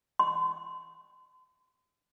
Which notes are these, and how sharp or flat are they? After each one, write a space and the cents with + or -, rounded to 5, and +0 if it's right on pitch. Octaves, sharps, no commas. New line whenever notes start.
C6 -40